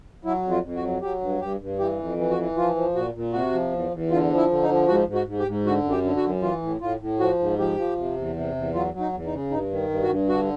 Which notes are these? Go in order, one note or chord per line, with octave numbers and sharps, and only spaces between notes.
F#3 E4
F2
F4
F2
F#4
F#3
F#3 G4
G2
G2 G4
G2
E3 G4
F2
E3
F#4
E3
F3 F4
F3
A#2 F#4
A#2
C3 F#4
F3
E2
E2
D3 F4
F3
E4
D3
D#4
F3
G#2 F#4
G#2
F#4
G#2
G4
G#2
D3 F#4
F#2
G4
D3
F#4
F#2
E3 F4
A2
A2 F4
A2
F3 F#4
G#2
F3 G4
F3
C3
E2
C3
E2
F#3 F4
F#3
D#4
E2
D#4
C#3
G2 D#4
D#3
G2
F#4
G2
D3 F#4